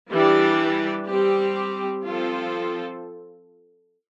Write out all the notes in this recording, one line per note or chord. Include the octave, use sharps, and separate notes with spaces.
E3 G3 D4 G4 D5
G3 C4 G4
F3 C4 F4 A4 C5